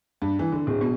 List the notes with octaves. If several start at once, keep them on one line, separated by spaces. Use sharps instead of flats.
G2
E3
D3
D1
B2